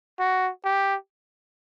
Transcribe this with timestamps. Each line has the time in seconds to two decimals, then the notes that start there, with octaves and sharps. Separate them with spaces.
0.19 F#4
0.64 G4